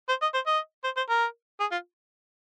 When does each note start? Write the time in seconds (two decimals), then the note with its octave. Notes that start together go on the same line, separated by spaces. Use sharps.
0.09 C5
0.22 D#5
0.34 C5
0.47 D#5
0.84 C5
0.97 C5
1.09 A#4
1.60 G#4
1.72 F4